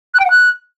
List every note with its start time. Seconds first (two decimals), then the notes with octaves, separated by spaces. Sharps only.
0.14 F#6
0.19 G5
0.25 F#5
0.30 F#6